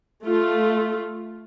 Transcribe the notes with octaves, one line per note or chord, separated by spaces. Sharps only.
A3 F4